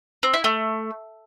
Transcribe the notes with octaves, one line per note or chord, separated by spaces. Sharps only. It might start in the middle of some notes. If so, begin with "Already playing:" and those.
C4
E4
A3